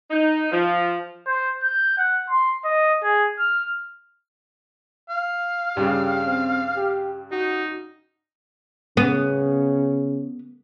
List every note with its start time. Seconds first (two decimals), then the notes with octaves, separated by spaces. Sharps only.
0.10 D#4
0.52 F3
1.27 C5
1.63 G6
1.98 F#5
2.30 C6
2.65 D#5
3.03 G#4
3.39 F6
5.09 F5
5.77 G2 C#3 G4
6.27 C4
6.77 G4
7.32 D#4 F#4
8.97 C#3 B3